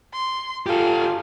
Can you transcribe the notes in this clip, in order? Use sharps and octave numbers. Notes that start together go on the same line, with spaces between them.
C6
F4 G4 A4 F5